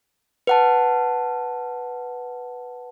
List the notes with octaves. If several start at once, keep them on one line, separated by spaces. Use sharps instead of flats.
B4 F#5 A5